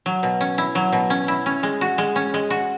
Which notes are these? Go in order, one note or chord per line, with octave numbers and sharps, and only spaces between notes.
F#3
B2
C#4
E4
F#3
B2
C#4
E4
C#4
G#3
F#4
G#3
C#4
G#3
F#4